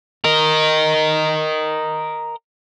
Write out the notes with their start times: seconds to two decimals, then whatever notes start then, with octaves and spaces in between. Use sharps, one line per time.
0.25 A#4 D#5